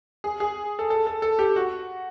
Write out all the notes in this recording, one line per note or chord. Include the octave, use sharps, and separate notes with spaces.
G#4
G#4
A4
A4
A4
A4
G4
F#4